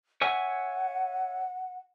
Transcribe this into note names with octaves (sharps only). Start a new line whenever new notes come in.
C#5 E5 F#5 G#5